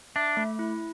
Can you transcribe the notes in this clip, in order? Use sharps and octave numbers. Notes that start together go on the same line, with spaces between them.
D4 E5
A3
E4